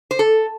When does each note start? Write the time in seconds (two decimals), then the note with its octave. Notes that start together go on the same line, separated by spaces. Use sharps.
0.11 C5
0.19 A4